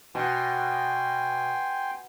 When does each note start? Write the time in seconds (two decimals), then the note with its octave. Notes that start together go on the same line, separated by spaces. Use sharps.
0.15 B2 G5 G#5 C6